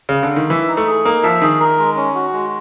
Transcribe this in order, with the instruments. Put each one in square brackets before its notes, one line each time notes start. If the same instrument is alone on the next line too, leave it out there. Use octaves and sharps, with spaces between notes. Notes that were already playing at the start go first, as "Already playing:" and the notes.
[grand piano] C#3
D3
D#3
[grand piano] E3 [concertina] E5
[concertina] D#4
[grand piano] A3
[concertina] G#4
[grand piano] A#3 [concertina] D#4
[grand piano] F3 [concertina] E5
[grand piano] D#3 [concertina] G#4
[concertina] A#4
G#3
C#4
F#4
G#3